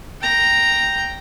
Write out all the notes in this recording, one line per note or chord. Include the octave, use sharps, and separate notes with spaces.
G5 A#5